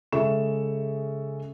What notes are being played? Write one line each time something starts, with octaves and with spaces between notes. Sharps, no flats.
C#3 G#3 A4 E5 C#6 E7